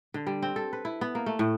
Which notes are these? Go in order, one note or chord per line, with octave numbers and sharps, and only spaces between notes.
D3
G3
C4
A4
B4
E4
B3
A#3
A3
A2